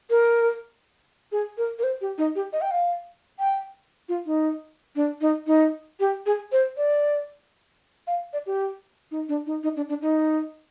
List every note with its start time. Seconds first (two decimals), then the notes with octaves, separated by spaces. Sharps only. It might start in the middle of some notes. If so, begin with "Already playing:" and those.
0.10 A#4
1.32 G#4
1.58 A#4
1.79 A#4
1.83 C5
2.01 G4
2.18 D#4
2.35 G4
2.53 D#5
2.61 G5
2.71 F5
3.39 G5
4.09 F4
4.26 D#4
4.96 D4
5.21 D#4
5.47 D#4
6.00 G4
6.26 G#4
6.52 C5
6.77 D5
8.07 F5
8.33 D5
8.46 G4
9.11 D#4
9.29 D4
9.46 D#4
9.63 D#4
9.76 D4
9.89 D4
10.02 D#4